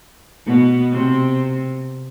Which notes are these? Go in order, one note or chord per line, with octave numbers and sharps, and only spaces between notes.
B2 B3
C3 C4